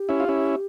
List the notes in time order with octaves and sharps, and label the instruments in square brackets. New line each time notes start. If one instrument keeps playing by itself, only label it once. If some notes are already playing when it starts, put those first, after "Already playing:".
Already playing: [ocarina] G4
[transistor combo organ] C#4 E4
F4
C#4 E4